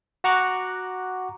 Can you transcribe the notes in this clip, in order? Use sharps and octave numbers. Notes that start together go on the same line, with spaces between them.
F#4 F#5 A#5 C#6 D6 F#6